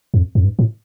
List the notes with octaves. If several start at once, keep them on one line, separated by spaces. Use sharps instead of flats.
F2
F2
G2
A2